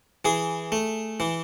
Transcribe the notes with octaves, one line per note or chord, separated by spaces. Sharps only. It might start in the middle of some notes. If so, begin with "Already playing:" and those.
E3 G#4
A3
E3